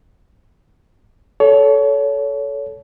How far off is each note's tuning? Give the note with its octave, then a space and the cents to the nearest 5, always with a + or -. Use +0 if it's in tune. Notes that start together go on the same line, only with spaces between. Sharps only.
A4 -15 C#5 +25